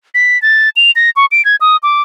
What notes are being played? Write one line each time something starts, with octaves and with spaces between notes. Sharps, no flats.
B6
A6
F7
A#6
C#6
D7
G#6
D#6
D6